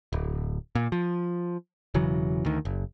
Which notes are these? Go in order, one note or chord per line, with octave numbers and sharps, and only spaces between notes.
D1
A#2
F3
E1 C#3 E3 F#3
D2 D#3
F#1